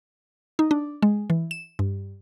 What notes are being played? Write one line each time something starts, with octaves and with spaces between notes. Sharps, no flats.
D#4
D4
G#3
E3
E7
G2